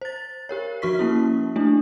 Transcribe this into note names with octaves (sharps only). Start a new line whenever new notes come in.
C5 A6
G4 A#4 C#5
F3 F#4 C#6 B6
A#3 C#4 E4
A3 D4 E4